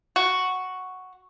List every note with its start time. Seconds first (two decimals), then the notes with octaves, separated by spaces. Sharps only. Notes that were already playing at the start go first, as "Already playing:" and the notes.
0.16 F#4